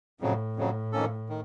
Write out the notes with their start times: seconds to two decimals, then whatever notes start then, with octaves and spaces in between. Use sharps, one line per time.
0.21 F2 A2 C#3 F#3
0.57 F2 C#3 F#3
0.92 F2 D#3 A#3 C#4 A4
1.29 D#3